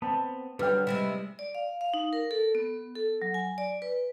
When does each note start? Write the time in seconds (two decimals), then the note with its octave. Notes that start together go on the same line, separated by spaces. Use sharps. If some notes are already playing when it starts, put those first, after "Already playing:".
0.02 B3 C4 A5
0.59 D3 F#3 G3 B4 G5 F6
0.87 C3 G3 G#3 E4
1.39 D5
1.55 F5
1.81 F5
1.94 D#4
2.13 A#4
2.31 A4
2.55 B3
2.96 A4
3.22 F#3
3.34 G#5
3.58 D5
3.82 B4